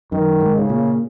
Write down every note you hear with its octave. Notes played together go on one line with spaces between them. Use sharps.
F#2 D#3
G#2
C#3
A#2